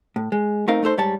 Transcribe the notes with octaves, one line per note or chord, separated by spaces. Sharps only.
A2
G#3
A3 C4 D#4 A#4 F5
A3 D#4 A4 C5
G#2 G3 C#5 A5